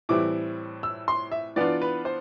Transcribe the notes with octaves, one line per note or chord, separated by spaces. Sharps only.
A2 E3 G3 C4 E4 D6
E6
C6
E5
E3 B3 D4 F4 D5
B4
C5